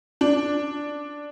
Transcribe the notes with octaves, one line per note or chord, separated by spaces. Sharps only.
D4